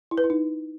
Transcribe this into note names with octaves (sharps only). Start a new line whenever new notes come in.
E4
B4
E4
D#4